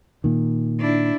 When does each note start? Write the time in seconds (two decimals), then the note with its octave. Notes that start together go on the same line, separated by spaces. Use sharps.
0.24 A#2 D#3
0.79 D4 E4